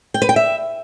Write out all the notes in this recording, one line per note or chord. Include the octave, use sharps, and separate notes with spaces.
G5
B4
G5
E5